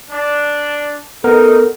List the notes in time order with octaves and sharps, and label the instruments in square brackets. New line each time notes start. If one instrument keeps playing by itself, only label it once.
[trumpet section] D4
[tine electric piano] B3 A#4 [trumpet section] D#4 [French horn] A4